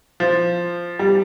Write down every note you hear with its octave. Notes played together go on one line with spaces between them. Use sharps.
F3
G3